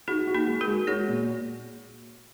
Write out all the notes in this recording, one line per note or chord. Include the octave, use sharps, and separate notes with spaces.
D#4 F#4 G#4
F#4
A#3 D#4
G#3
F#4 A#4
G#3
F#4 G#4 C#5
A#2